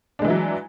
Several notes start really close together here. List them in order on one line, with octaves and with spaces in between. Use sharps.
D4 G#3 E3 E4 F#3